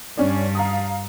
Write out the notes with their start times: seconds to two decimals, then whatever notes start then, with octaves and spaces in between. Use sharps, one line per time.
0.17 G2 G3 C#4 D4
0.55 F5 A#5 D#6